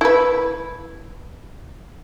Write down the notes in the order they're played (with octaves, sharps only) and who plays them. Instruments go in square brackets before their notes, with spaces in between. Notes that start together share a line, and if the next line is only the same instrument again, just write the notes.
[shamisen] E4 B4